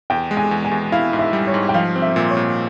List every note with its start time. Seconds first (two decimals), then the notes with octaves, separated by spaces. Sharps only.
0.10 E2 G5
0.31 G#3
0.37 G#5
0.51 E2
0.65 G#5
0.71 E2
0.92 E4 F5
1.13 G#2
1.19 E5
1.33 G3
1.47 C#5
1.54 G#2
1.69 G5
1.74 F3 F5
1.96 C4
2.02 E5
2.16 A#2
2.30 C#5
2.37 A#2